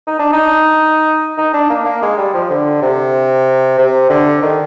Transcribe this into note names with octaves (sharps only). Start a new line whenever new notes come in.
D#4
D4
D#4
D#4
D4
A#3
A#3
G#3
G3
F3
D3
C3
C3
D3
D#3